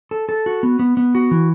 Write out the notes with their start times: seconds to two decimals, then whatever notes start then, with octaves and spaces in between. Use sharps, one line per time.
0.11 A4
0.29 A4
0.46 F#4
0.63 B3
0.79 B3
0.97 B3
1.15 F#4
1.31 E3